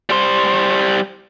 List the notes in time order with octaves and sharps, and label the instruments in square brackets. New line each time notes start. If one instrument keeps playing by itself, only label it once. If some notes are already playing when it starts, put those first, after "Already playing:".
[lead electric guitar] G3 C5